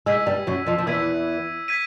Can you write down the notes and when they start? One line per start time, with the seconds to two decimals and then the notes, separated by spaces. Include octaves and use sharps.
0.06 G#2 G#3 E6 G#6 B6 D#7
0.26 G2 G3
0.47 F#2 F#3
0.66 F2 F3
0.78 F3
0.87 E2 E3 E6 G#6 B6 D#7
1.68 G#6 B6 D#7